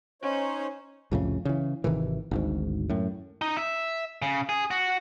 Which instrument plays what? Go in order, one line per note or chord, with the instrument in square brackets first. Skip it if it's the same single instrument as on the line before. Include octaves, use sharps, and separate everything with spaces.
[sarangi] C#4 [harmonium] D#4 C5 C#5
[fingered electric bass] C2 F2 A2 C#3
C#3 E3
G#1 C3 D#3 E3
G#1 D2 G#2
F#2 A2
[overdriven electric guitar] D#4
E5
C#3
G#4
F#4